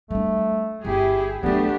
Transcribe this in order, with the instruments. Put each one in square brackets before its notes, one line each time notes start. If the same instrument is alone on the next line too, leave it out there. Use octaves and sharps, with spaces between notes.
[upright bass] G3 D4 [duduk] A3
[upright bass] G1 [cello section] E4 G#4 [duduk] G4
[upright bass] F#3 G3 [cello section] A3 D4 G4 [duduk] B3